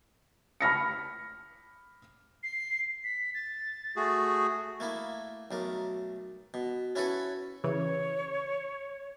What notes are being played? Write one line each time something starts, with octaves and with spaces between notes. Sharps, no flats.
B5 F6 A#6 C#7
C7
B6
A6
A3 F#4 G#4
A3 A#3 E4
B1 A3 A#4
B2
C#4 E4 F#4 A4 B4
C#3 E3 C#5